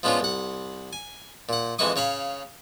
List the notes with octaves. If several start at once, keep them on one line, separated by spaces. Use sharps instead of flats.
F3 G#3 B3 C#4 D4 F4
C2 F#5
G#5
A#2 F#5
F2 E3 G#3 E4 C#6 D#6
C#3 C#5 F5 B5